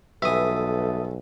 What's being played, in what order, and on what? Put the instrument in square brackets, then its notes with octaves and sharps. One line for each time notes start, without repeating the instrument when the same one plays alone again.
[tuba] B1 [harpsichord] G2 E3 [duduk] A4 [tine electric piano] E5 D#6